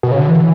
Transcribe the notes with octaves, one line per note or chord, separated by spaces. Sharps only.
B2
C#3
D3
E3